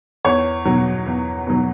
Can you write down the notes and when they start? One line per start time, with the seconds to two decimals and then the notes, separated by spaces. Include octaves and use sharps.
0.25 E2 C#5
0.65 B2 F#3
1.06 E2
1.47 B2 F#3